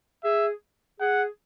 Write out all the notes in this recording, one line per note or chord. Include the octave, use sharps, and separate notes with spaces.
G#4 E5
G#4 F#5